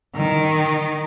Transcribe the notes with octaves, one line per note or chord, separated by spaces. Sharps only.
D#3